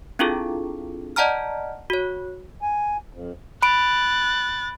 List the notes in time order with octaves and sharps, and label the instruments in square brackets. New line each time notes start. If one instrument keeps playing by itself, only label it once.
[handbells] C4 D4 E4 F4 G#4 A4
D5 D#5 F#5 A5 A#5 F6
F#4 C#5
[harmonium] G#5
F2
[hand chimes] B5 D7 [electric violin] F#6 A6